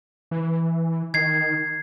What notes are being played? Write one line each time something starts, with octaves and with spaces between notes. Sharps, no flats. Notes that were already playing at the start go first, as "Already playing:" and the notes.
E3
D#3 G#6 C7